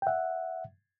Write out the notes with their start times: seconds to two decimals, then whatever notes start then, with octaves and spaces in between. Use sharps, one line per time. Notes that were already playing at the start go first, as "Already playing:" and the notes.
0.02 G5
0.07 E5 F#5